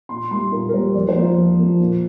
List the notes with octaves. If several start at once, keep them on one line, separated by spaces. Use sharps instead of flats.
A#2 C6
G3 A#3 C6
A#2 A#4
A#4
G3 A#3 C5
F2 D5
C5
F3 A#3
F4
F2
F3 A#3
A#2